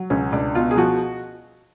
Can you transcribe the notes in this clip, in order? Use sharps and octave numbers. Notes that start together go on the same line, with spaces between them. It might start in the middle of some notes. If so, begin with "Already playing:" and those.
Already playing: F#3
C#2 C#4
C#2 D4
B2 F4
G#4
F3 F#4